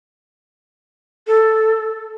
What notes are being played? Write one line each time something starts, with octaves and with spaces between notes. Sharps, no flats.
A4